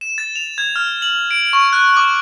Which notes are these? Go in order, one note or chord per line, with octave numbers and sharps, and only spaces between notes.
E7
A6
F7
G#6
F6
F#7
D7
C#6
F#6
D6